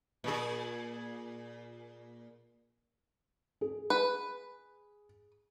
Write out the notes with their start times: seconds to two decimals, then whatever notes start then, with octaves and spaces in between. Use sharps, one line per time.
0.24 A#2 G#4
3.61 G#4
3.90 B4